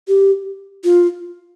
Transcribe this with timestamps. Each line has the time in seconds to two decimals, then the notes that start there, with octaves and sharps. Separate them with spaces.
0.08 G4
0.84 F4